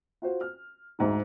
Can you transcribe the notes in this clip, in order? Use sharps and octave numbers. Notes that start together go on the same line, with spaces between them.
F4 F#4 C5
F6
D2 G#2 D#4